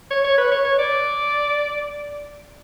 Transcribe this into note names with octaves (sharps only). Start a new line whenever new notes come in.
C#5
C#5
B4
C#5
C#5
D5